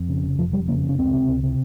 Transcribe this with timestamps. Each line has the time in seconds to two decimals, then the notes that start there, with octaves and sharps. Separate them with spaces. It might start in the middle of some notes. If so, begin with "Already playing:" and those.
Already playing: F2
0.09 C#3
0.24 F1
0.39 F1 F3
0.53 F2 G3
0.68 C#3 A#3
0.83 F1
0.89 C#4
0.98 C#2 C4
1.13 C3
1.28 C#2
1.43 C3